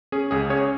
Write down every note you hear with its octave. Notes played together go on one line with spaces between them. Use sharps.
C#4 G#4
C#2 G#4
C#4 G#4 C#5